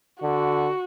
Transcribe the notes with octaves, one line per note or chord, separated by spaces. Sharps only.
D3 F#4